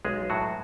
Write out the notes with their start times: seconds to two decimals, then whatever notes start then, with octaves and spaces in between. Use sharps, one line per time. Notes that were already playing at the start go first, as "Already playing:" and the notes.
0.05 B1 G#3 G#4
0.30 A2 F#3 F#4